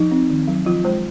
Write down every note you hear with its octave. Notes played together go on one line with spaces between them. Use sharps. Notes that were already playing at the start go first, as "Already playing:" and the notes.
Already playing: F3 D#4
C4
D#3
F#3
F3 F4
G#3 C5